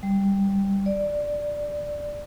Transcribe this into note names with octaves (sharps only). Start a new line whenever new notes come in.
G3
D5